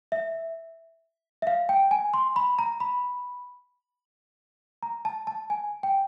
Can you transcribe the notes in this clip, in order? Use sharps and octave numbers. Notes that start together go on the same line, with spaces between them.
E5
E5
F5
G5
G#5
C6
B5
A#5
B5
A#5
A5
A5
G#5
G5